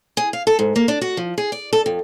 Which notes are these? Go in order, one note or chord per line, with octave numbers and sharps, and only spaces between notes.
G#4
F5
A4
G#2
A#3
D4
F#4
F3
G#4
D5
A4
F2